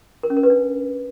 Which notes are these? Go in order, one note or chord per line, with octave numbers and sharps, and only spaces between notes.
A#4
C#4
A#4
B4
D4